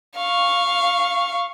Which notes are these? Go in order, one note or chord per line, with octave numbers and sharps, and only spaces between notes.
F5 C#6